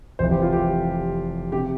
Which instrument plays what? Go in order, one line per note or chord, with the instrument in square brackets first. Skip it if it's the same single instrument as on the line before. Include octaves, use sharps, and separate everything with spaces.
[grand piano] F1 F2 E3 C5
G4
F4
G4
C3 G4